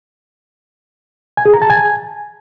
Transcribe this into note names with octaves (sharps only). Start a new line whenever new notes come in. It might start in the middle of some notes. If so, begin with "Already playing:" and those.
G#5
G#4
A#5
A5
G#5